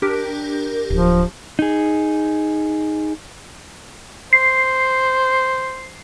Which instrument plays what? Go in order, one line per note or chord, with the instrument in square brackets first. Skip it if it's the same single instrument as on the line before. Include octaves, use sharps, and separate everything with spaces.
[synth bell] D4 G4 A#4
[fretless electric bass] D1 [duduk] F3
[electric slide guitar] D#4 G#4
[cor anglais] C5 [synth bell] C7